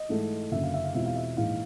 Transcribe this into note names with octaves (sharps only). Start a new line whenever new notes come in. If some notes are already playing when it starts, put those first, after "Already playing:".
Already playing: D#5
G#2 E3 A3
F#1 F#2 D3 E5
F5
E5
F5
E2 B2 G#3 C4 F4 E5
F5
E5
A#1 G#2 E3 F5